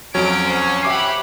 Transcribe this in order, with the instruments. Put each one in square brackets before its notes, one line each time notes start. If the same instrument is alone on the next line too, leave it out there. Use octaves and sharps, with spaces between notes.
[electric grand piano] F2 F#3 [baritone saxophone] C#4 [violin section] D7
[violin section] C5 F#5
[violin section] G4 F#5 B5 [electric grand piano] E5 D6 C7